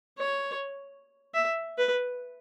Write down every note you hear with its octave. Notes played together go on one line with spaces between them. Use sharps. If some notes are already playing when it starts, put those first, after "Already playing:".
C#5
E5
B4